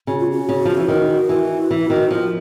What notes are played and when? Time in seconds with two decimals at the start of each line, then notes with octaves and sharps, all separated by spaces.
0.07 C#3 F#4
0.18 F4
0.31 F#4
0.49 C#3
0.65 F3
0.77 E3
0.88 D#3
1.29 E3
1.71 E3
1.90 D#3
2.11 F3